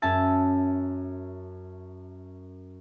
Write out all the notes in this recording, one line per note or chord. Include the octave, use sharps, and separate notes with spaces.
F#2 C#4 E5 G#5 A5 E6